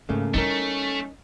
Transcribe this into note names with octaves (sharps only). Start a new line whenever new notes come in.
G#2 C#3 A3 A#3
G3 A3 C#4 D#4 E4 A#4